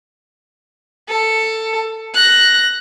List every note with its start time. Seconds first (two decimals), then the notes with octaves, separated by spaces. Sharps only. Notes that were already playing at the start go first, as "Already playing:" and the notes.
1.09 A4
2.14 F#6 A#6